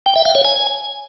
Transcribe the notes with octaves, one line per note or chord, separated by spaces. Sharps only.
G5
E5
F5
C#5
G#5